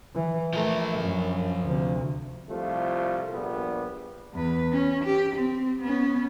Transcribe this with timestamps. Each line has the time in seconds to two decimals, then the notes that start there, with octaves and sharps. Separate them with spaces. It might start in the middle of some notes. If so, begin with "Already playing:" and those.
0.15 E3
0.53 F3 A3 A#4
1.00 F#2
1.65 D2 C3
2.49 C2 F3 A3 F4
3.33 A#1 A#2 G3 B3
4.33 E2 B4
4.72 C#4
5.04 G4
5.36 C4
5.81 B3 C#4